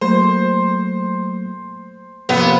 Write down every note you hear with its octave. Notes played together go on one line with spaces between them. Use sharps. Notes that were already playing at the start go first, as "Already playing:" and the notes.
F#3 A3 A#3 C5
C3 F3 A#3 B3